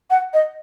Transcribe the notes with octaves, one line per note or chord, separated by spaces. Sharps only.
F#5
D#5